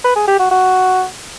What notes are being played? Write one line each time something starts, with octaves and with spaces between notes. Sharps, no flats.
B4
G#4
G4
F#4
F#4